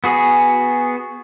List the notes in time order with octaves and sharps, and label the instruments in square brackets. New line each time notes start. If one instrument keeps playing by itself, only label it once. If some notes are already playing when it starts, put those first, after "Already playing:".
[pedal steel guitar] B3 F#4 G#4